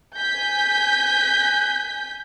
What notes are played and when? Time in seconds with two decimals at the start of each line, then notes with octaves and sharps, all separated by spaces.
0.16 G#5 G6 B6